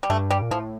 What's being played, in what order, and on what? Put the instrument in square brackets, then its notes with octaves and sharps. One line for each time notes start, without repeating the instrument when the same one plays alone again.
[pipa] G3
[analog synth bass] G2 [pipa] A3
[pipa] G3
[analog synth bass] A#2
[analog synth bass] A2 [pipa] F3